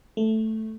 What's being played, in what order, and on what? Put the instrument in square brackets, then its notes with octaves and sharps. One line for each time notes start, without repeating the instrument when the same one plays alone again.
[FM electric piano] A3